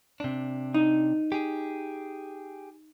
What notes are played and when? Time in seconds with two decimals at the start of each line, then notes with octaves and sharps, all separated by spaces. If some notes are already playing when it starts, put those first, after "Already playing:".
0.20 C3 D4
0.74 D#4
1.32 G4 G#4